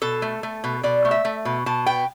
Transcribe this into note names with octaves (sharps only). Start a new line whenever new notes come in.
B2 A4
A3
A3
B2
B2 D5
A3
E5
A3
B2
B2 A5
B3 G5